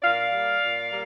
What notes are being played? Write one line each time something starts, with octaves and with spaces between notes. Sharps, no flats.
A#2 D5 F5
G3 A#3
A#2
G3 A#3